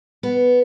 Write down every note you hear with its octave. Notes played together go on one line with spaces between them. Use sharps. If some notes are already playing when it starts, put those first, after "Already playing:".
B3